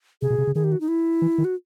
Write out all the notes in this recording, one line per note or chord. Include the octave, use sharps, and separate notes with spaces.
C3 G#4
B2
C3
C#3
D#3 G#4
G4
F#4
D#4
E4
E3
D#3
F#4